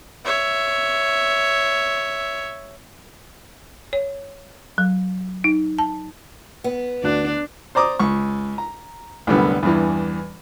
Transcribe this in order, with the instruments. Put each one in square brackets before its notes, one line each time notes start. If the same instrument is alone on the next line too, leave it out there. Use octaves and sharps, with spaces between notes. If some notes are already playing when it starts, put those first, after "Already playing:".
[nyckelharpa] C#5 E5
[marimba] C#5
F#3
D#4
A5
[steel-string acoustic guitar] B3
[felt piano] D2 F#4 F#6 [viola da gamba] D4
[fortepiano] C5 D5 A#5 D6 D#6
C#2 C#6
A#5
C2 F#2 A2 D3 G3 B3
E2 G2 E3